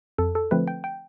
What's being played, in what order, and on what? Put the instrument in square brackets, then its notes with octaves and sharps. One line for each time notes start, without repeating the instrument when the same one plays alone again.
[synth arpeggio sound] F2 A4
A4
D3 F3 A3 C4 B4
G5
G5